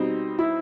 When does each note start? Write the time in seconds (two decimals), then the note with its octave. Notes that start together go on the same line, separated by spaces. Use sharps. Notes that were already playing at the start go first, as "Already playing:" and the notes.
Already playing: B2 G3 C4 D#4
0.39 E4